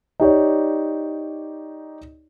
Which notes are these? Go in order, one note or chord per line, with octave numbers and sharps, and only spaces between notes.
D#4 G4 C#5 D5